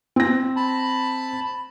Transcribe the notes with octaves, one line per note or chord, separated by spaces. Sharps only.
C4 A#6
A5 B5